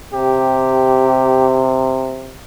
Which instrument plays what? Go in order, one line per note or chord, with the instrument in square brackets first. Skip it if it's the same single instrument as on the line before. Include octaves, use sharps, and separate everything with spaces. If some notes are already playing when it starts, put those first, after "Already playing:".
[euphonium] C3 [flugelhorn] G4